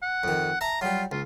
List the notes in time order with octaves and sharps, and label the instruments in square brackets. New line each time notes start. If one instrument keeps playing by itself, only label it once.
[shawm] F#5
[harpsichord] F2 D#3
[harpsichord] E5 A5 [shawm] A#5
[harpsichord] F#3 G3 [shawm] F4
[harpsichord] C#2 [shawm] F4